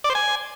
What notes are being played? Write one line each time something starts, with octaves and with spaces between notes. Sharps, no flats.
D5
C5
G#5